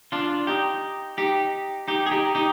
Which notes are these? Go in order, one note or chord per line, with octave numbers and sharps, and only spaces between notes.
D4 F4
D#4 G4
D#4 G4
D#4 G4
G#4
D#4 G4
D#4 G4